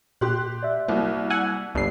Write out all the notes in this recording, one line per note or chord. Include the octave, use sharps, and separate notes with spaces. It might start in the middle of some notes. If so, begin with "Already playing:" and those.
A#2 G4 C6 F#6
D5 E5
C2 F#3 A#3
F#5 G#5 E6
G1 C#2 G2 C7